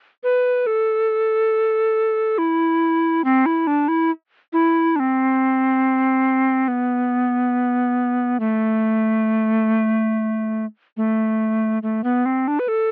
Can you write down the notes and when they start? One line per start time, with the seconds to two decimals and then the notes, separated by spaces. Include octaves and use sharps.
0.24 B4
0.67 A4
2.38 E4
3.24 C4
3.46 E4
3.67 D4
3.88 E4
4.53 E4
4.96 D4
5.00 C4
6.68 B3
8.40 A3
10.97 A3
11.83 A3
12.04 B3
12.26 C4
12.48 D4
12.59 B4
12.68 A4